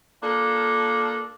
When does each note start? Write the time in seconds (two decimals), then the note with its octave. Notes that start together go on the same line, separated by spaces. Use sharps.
0.23 A#3 D4 F4 A4